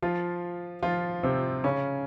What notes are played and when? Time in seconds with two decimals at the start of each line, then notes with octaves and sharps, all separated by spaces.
0.02 F3 F4
0.83 F3 F4
1.23 C3 C4
1.64 C#3 C#4